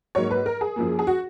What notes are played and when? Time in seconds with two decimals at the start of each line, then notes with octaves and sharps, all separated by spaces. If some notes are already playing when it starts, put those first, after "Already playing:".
0.15 G#2 F#3 A#3 C#5
0.30 B4
0.46 A#4
0.61 G#4
0.76 F#2 F3 A#3
0.99 G#4
1.07 F#4